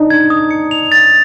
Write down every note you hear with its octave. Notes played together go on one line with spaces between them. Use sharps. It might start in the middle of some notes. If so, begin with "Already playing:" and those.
Already playing: D4 D#4
G#6
D#6
C#7
F7
A6